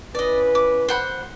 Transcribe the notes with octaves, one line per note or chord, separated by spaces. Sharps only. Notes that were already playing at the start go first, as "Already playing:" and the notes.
C#4 E4 B4 D5 D#5
D6
C5 F#5 B5